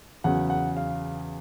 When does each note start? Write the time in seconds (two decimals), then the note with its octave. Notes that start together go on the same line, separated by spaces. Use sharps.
0.24 E2 C#3 F#3 F#5
0.50 F#5
0.77 F5